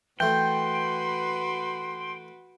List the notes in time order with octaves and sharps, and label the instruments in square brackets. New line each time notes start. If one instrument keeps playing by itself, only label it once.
[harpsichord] E3 A3 [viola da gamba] F#4 B4 [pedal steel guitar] G5 [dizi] C6